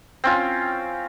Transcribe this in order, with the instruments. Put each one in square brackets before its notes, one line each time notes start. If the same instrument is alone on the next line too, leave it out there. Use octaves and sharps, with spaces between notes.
[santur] C4 C#4 F4